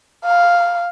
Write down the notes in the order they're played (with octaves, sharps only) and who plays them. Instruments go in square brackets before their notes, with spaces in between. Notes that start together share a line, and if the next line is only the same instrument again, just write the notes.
[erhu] F5